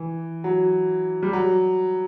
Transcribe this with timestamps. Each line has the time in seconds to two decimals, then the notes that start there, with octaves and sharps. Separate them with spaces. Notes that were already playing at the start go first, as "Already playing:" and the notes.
Already playing: E3
0.44 F#3
1.23 G3
1.33 F#3